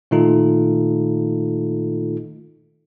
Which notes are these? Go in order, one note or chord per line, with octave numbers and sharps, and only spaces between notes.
A#2 D#3 A3 D#4 F4 A4